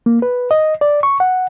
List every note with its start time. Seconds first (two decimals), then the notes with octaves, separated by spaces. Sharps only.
0.06 A#3
0.22 B4
0.51 D#5
0.81 D5
1.03 C#6
1.20 F#5